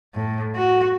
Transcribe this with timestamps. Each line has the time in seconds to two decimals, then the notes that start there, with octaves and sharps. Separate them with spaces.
0.15 A2
0.55 F#4